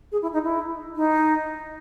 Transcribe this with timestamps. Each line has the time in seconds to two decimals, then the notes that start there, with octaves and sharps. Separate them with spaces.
0.12 G#4
0.22 E4
0.33 D#4
0.44 E4
0.96 D#4